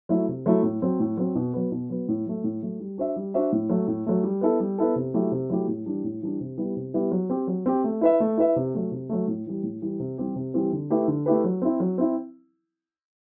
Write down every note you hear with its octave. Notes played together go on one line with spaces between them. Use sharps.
F#3 A3 E4
C3
F#3 A3 E4
A2
F#3 C4
A2
F#3 C4
B2
F#3 B3
B2
F#3 B3
A2
F#3 A3
A2
F#3 A3
G3
D4 F#4 C5 E5
G3
D4 F#4 C5 E5
A2
F#3 A3
A2
F#3 A3
G3
B3 E4 A4
G3
B3 E4 A4
C3
F#3 A3 E4 G4
C3
F#3 A3 E4 G4
A2
E3 G3 D4
A2
E3 G3 D4
C3
G3 B3 E4 G4
C3
G3 B3 E4 G4
F#3
C4 G4
F#3
C4 G4
A3
E4 B4 E5
A3
E4 B4 E5
C3
F#3 A3
C3
F#3 A3
A2
E3 G3
A2
E3 G3
C3
E3 G3 C4 G4
C3
E3 G3 C4 G4
D3
A3 E4 G4 B4
D3
A3 E4 G4 B4
F#3
C4 E4
F#3
C4 E4